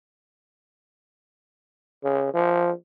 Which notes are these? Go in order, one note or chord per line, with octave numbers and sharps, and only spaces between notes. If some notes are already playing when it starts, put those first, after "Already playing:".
C#3
F3